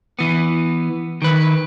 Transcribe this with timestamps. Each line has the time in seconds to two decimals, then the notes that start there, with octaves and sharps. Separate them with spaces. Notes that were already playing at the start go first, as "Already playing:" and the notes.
0.19 E3 B3
1.22 D#3 B4